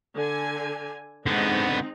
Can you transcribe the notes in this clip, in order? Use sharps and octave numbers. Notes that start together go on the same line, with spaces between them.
D3 G#5
D3 G#3 B3 C4 D#4